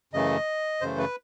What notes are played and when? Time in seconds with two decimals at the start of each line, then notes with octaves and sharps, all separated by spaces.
0.13 F#2 C#3 E3 A3 D#5
0.81 F#2 C#3 E3 A3 C5
0.98 B4